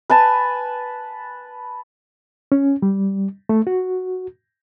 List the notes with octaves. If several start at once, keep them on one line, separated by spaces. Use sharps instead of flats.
B4 G#5 A5
C#4
G3
A3
F#4